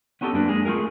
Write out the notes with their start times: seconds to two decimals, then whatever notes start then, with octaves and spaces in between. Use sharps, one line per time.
0.21 B3 C#4 D#4 G4 A4
0.33 F#2 A#3 D4 B4
0.48 G#3 A#3 G#4
0.65 A3 F4 G#4 A#4